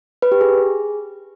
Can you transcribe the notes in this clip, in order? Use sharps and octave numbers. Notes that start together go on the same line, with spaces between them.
B4
G4
G#4